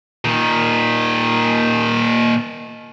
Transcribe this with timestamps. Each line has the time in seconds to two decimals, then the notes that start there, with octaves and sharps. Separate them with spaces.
0.25 A#2 D#3